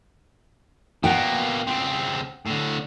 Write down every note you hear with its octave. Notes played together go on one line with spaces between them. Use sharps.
B2 A#3 F#5 G5
C#2 C4
A2 D3